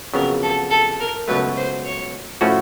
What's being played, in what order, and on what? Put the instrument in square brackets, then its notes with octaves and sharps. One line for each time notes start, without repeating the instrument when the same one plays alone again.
[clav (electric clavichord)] F2 C#3 F#3 B3 [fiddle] A#4
[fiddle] A4
A4
A#4
[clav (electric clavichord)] C#2 B2 F#3 A3 [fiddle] B4
[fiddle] C5
C#5
[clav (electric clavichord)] A2 F3 A3 C#4 F#4